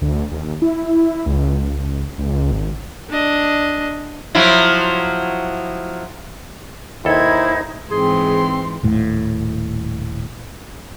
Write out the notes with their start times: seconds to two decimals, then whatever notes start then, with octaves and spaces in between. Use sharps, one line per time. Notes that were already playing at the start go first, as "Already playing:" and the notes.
0.02 D2
0.32 D#2
0.62 E4
1.26 C#2
2.18 C#2
2.51 G#1
3.10 D4 D#5
4.35 F3 F#3 E4
7.05 D#2 D#4 E4 A4 C5 G#6
7.91 G#2 E3 C4 G#4 C6
8.83 D#1 A2